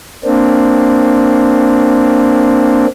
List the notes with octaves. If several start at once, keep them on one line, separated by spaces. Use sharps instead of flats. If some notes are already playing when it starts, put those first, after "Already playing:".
A#3 C4 D4